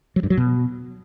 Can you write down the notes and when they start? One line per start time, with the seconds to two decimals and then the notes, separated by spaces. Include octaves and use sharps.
0.16 F#3
0.23 G2
0.30 F#3
0.37 B2